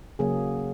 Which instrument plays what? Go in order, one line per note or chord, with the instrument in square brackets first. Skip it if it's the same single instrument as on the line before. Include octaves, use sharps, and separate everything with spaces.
[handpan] C#3 F#3 A#3 G#4